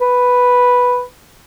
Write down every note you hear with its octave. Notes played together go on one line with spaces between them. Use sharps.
B4